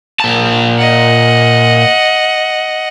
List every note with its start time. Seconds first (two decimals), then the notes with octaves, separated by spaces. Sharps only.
0.20 A#2 A5
0.77 D#5 F#5